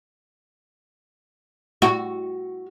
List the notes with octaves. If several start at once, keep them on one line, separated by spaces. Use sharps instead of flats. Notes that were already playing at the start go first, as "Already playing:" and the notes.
F#4